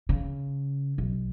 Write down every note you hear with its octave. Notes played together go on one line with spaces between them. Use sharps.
C#3
B1